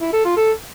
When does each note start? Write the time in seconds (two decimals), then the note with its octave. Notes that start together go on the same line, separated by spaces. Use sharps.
0.01 E4
0.13 A4
0.25 F4
0.37 A4